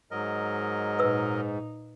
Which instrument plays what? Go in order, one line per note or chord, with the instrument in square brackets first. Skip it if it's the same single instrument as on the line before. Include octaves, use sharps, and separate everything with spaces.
[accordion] G#2 [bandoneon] F#3 A#4 D#5
[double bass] A#2 D#4 [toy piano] B4 E6